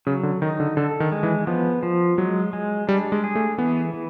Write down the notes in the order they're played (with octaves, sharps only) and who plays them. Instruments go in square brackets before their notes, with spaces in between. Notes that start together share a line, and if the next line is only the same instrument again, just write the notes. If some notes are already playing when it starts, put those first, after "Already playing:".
[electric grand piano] C#3 [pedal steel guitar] F#3
[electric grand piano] D3
[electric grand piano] D#3 [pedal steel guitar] D#4
[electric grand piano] D3
[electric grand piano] D3 [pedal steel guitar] A4
[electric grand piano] D#3
[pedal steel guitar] G#3
[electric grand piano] E3
[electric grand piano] F3 [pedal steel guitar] B3
[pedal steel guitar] F3
[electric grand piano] F#3 [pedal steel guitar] G#3
[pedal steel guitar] G#3
[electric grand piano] G3 [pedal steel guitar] D4
[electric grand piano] G#3
[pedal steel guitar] G#4
[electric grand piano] A3
[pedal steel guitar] E3 [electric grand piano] B3
[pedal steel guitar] E3